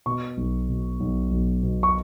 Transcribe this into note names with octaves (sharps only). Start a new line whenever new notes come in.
B2 C#6
B1
B2
B1
B1
B2
C#6